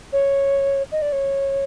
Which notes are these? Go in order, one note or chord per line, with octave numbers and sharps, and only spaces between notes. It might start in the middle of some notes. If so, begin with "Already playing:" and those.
C#5
D#5
D5
C#5